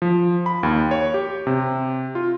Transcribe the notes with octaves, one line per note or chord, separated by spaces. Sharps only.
F3
B5
D#2
C#5
G4
C3
F4